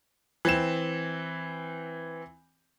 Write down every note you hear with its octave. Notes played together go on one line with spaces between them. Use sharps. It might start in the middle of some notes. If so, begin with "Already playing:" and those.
E3 C4 E7